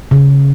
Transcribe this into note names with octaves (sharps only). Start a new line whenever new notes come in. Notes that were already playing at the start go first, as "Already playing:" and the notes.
C#3